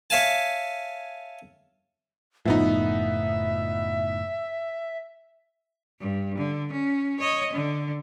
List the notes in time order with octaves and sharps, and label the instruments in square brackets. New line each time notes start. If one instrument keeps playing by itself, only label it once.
[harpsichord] C#5 E5 F5 G#5 A5
[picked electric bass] F#1 A2 [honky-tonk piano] F3 B3 D#4 [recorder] E5
[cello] G2
D3
C#4
C#5 D#5
D3